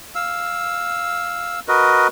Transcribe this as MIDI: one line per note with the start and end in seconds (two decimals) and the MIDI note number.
0.15 1.60 77
0.15 1.60 88
1.68 2.08 66
1.68 2.08 70
1.68 2.08 71
1.68 2.08 75